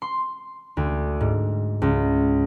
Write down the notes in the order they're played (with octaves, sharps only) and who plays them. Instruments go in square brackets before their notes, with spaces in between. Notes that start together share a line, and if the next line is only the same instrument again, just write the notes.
[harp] C6
D2
G#2
C#2